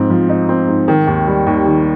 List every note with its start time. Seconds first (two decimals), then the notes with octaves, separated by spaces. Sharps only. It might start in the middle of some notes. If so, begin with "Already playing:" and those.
Already playing: G#2 F3 C4
0.10 F3
0.29 D#4
0.49 C4
0.68 G#2
0.88 D#3
1.07 D#2
1.27 G3
1.46 D#2
1.66 D#3